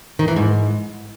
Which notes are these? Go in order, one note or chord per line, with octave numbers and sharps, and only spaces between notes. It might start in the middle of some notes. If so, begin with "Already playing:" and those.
D#3
E3
G#2